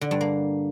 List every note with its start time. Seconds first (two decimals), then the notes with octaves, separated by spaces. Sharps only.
0.01 D3
0.11 G2
0.21 A#3